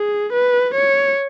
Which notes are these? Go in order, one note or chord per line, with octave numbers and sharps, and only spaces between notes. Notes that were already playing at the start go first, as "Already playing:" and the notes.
Already playing: G#4
B4
C#5